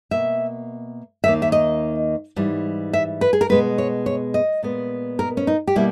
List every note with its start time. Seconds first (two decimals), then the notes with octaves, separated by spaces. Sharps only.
0.11 B2 A#3 E5
1.24 D#2 D#3 A#3 E5
1.42 E5
1.52 D#5
2.36 G#2 E3 G3
2.93 E5
3.21 B4
3.33 G#4
3.41 A#4
3.49 B2 G#3 B3 B4
3.78 C#5
4.06 C#5
4.34 D#5
4.63 A#2 G#3 B3
5.19 A#4
5.37 C#4
5.47 D#4
5.67 G4
5.76 B2 G3 A#3 E4